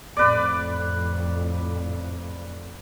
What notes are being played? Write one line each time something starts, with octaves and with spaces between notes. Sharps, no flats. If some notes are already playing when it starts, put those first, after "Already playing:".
F2 A2 B4 D5